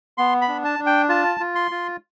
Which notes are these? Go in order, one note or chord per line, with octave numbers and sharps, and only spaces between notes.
B3 C6
B5
D4
A5
D4
G5
F4 A5
F4
C6
F4